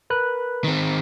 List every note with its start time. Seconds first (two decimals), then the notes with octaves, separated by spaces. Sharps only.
0.10 A#4 B4 F#6
0.64 D#3 C4